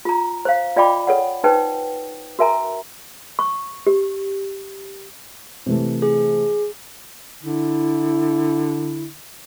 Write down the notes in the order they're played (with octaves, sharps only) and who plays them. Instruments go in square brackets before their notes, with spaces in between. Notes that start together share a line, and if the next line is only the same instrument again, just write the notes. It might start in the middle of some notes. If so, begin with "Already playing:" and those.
[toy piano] F4 A#5
C5 F5
F4 D5 D#5 G5 B5 D6
A4 C#5 F#5
D#4 B4 C5 G5
F#4 A#4 E5 G#5 A#5
C#6
G4
[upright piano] C3 E3 A3
[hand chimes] G#4
[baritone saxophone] D3 [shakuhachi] E4